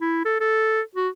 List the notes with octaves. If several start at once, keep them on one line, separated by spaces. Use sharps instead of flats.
E4
A4
A4
F#4